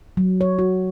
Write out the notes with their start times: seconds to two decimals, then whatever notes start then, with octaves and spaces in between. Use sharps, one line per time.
0.17 F#3
0.41 C#5
0.59 F#4